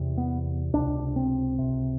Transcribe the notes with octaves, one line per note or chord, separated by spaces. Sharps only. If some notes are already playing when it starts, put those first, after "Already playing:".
Already playing: E2 C3
B3
C#2 C3 D4
C4
C#2 C3